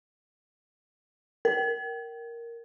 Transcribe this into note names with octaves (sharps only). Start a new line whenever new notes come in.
A#4